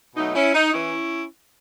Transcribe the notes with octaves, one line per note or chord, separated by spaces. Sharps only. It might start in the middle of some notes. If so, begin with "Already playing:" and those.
B2 F#3 A3 D#4
C#4 E4
D#4
E3 C#4 E4